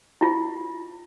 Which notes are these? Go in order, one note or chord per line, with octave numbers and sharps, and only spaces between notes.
E4 F4